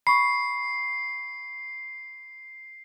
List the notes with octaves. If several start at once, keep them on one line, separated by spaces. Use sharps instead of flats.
B5 C#6 C7